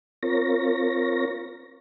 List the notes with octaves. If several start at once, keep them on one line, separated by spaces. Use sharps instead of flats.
C4 F4 A#4 C#5 A#6